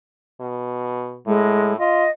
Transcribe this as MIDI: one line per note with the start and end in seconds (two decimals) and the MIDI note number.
0.40 1.18 47
1.27 1.79 45
1.27 1.74 56
1.79 2.04 65
1.79 2.10 75